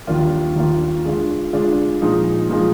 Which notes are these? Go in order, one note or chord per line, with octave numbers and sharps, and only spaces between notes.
D#2 D#3 A#3 D4 F4
D#2 D#3 A#3 D4 F4
D3 G#3 D4 F4
D3 G#3 D4 F4
A#2 F3 G#3 D#4
A#2 F3 G#3 D#4